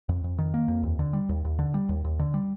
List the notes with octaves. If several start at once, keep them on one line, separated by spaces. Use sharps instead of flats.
F2
F2
D#3
A#3
F2
D#2
D3
G3
D#2
D#2
D3
G3
D#2
D#2
D3
G3